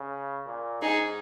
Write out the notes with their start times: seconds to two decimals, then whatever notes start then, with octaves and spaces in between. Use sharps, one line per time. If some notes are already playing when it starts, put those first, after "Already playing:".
Already playing: C#3
0.47 A#2
0.81 G#2 D#4 G#4